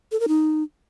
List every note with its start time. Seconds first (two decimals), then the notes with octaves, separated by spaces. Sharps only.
0.12 A4
0.20 A#4
0.28 D#4